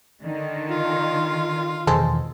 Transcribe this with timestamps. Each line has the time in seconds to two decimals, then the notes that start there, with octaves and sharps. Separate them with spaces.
0.22 D3 D#3
0.69 F4
1.87 E2 B2 D#3 G#3 A4 C5